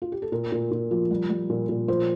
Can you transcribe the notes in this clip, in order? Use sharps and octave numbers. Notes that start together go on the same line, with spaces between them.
F4
G4
A4
A#2 A#4
A#2
A#2
F3
G3
G3
A#2
A#2
F3 C5